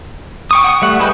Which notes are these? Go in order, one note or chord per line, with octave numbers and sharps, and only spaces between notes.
G5 C#6 D#6
F#5 C#6 D#6
G3 A3 F#5
E4 G#4 B4 D#5 G5